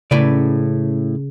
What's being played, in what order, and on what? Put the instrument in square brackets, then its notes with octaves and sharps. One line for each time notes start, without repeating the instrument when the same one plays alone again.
[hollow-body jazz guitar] A2 B4 D5 [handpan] C#3